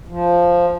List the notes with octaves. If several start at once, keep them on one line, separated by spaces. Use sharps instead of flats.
F3